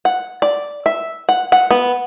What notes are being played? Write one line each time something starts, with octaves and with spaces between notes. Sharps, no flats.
F#5
D5
E5
F#5
F#5
B3